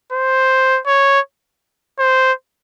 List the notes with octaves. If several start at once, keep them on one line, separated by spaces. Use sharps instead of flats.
C5
C#5
C5